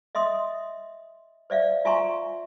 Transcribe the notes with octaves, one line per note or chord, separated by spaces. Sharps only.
D#5 E5 C6 D#6
C5 D5 E5 F5
F4 E5 G#5 A#5 C6 C#6